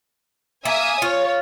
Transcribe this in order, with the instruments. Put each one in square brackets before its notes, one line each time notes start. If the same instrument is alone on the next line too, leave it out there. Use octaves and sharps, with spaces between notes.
[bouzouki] A#3 [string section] E5 G#5 D#6
[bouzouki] F4 [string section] C#5